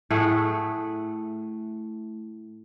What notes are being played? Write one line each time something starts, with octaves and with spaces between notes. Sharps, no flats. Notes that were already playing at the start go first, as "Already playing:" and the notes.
A2 A3 G#4 F#5